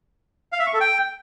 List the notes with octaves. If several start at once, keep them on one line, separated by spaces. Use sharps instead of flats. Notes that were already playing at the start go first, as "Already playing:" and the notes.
F5
E5
C#6
A4
G5